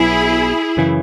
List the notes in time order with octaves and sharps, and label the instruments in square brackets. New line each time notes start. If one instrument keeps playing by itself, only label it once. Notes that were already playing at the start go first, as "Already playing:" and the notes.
Already playing: [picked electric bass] B1 B2 F#3 B3 [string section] E4 G#4
[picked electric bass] F#2 C#3 E3